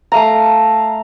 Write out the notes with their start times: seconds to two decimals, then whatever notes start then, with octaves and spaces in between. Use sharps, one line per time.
0.12 A3 F5 A#5